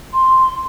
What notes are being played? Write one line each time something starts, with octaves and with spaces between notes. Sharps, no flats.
C6